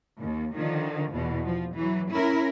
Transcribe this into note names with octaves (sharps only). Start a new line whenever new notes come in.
D#2
D3 D#3 F3
E2 B2
F3
E3 F#3
C#4 E4 A#4